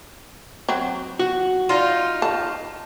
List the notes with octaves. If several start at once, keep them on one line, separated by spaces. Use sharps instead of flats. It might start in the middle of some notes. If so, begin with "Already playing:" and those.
F#3 C4
F#4
D#4 F4
A5